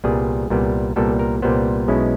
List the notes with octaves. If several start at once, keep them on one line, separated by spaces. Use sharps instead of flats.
C2 A#2 G3 B3 G#4
C2 A#2 G3 B3
C2 A#2 G3 B3 A4
A#4
C2 A#2 G3 B3 C5
B1 B2 G#3 C#4 E4